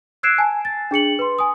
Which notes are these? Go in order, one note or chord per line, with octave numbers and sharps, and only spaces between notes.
E6 F#6 G#6 C7 D7 E7
G#5 A5
A6
D4 G#4 C#7 F#7
B4 C6
G#5 D#6